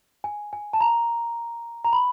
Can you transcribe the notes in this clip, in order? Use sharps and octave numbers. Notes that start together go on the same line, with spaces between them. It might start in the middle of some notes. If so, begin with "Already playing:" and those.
G#5
G#5
A5
A#5
A#5
B5